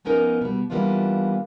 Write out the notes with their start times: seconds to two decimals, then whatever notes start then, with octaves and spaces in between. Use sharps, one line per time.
0.05 F3 B3 C#4 D#4 A#4
0.42 B2 G3
0.70 E3 G3 A#3 B3 D4 F4